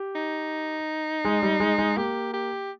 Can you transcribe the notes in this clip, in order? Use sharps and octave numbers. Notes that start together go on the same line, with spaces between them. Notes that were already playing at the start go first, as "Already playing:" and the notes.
Already playing: G4
D#4
G#3
G3
G#3
G#3
A#3 G4
G4